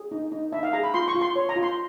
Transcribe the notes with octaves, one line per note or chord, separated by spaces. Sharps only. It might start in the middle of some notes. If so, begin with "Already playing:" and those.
Already playing: G#4
D#4
D#4
D#4 E5
F5
G#4 A#5
B5
F4 C6
C#6
F4
C6
C#5
A#5
F4
C6